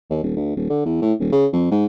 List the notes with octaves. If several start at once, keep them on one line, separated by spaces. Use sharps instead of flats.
D#2
D#1
D2
D#1
D3
E2
A2
D#1
C#3
F2
G#2